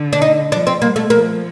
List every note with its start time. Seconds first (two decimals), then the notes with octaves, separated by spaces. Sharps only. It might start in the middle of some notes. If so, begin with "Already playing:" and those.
Already playing: D3
0.13 D4
0.22 D#4
0.52 F3 D4
0.67 C4
0.81 G3 A#3
0.96 A3
1.10 F3 A#3